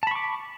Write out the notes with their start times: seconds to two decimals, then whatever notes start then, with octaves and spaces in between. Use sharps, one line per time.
0.03 A5
0.07 B5
0.11 C#6
0.15 D6